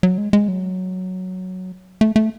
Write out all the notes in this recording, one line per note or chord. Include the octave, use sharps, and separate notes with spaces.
F#3
G#3
G#3
F#3
A3
A3